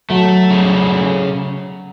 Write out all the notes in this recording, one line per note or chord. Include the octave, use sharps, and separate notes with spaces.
F#3 A3
C#3